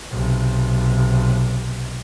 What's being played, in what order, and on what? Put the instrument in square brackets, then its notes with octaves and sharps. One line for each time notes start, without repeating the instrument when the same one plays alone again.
[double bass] B1 C3